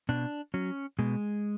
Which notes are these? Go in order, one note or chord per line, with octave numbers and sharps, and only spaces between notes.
B2 D4
F#3 C#4
B2 G#3